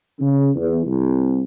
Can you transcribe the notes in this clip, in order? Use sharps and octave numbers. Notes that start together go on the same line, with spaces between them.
C#3
E2
C2